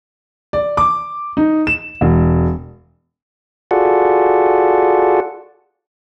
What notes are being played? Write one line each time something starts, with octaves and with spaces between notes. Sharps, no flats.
D5
D6
D#4
E7
E1
F4 F#4 G#4 A4 D5 F#5